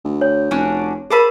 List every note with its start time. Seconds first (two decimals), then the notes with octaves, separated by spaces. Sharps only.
0.04 D2
0.21 C#5
0.51 F1 C#4 D4 F#4
1.10 G#4 A#4 C5 A5 B5